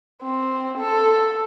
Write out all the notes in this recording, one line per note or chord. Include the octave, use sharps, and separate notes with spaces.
C4
A4